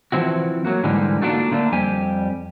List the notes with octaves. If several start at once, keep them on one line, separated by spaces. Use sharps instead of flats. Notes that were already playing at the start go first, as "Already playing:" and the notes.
E3 F3 C4 E4 F#4
F#3 A#3 F#4
G#2 D3 E3 G3 G#3 D#4
A#3 D4 D#4 F4 F#4 A4
D3 A3 A#3 D4
F2 G3 G4 G#5